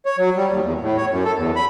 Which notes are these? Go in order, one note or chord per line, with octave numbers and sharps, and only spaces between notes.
C#5
F#3
G3
D#2
E2
A2
C#5
F#2
A4
E2
B5